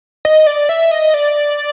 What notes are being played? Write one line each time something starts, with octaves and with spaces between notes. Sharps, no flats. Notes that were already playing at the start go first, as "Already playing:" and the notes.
D#5
D5
E5
D#5
D5